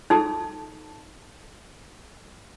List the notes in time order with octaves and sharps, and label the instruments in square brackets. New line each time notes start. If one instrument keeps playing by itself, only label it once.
[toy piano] D#4 G#4 A4 A5